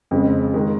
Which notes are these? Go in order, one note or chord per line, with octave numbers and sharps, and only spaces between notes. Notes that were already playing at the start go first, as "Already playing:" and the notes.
F2 C#3 G#3
D#3 G#3